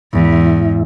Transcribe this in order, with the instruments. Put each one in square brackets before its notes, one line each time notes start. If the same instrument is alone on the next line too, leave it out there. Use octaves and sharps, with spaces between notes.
[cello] E2 [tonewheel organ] G#2 E4